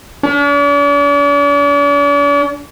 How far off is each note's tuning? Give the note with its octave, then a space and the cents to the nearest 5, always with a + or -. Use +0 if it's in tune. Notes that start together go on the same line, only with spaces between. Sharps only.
D4 -45